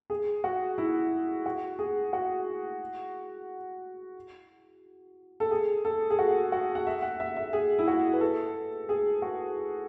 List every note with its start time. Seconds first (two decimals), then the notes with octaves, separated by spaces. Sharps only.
0.10 G#4
0.44 F#4
0.78 E4
1.46 F#4
1.79 G#4
2.13 F#4
5.40 A4
5.51 G#4
5.85 A4
6.10 G#4
6.19 F#4
6.52 F#4
6.75 F#5
6.87 E5
7.02 F#5
7.20 E5
7.37 E5
7.53 G#4
7.79 E4
7.88 F#4
8.13 B4
8.21 A4
8.89 G#4
9.22 F#4